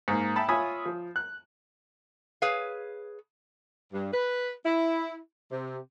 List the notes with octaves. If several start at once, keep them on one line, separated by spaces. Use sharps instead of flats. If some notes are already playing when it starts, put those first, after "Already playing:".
G#2 A#3
E5 G5 A5 B5
F4 C#5 E5 G#5 B5 D#6
F3
F#6
G#4 B4 C#5 F5
G2
B4
E4
C3